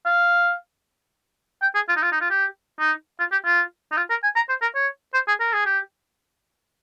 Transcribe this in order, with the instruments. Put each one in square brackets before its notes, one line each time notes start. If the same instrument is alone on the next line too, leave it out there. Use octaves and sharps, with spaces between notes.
[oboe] F5
G5
G#4
F4
D#4
F4
D#4
F4
G4
D#4
F4
G4
F4
D#4
F4
A#4
G#5
A#5
C5
A#4
C#5
C5
G#4
A#4
G#4
G4